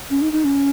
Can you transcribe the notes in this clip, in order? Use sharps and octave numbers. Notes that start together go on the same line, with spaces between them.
C#4
D#4
D#4
C#4